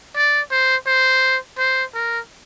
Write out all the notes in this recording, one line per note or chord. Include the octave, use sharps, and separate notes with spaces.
D5
C5
C5
C5
A#4